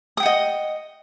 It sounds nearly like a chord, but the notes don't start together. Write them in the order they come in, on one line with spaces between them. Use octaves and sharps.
D#6 G5 F#5 D#5